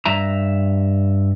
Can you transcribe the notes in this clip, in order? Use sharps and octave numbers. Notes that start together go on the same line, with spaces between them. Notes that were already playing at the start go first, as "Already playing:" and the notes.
G2 E5 A#5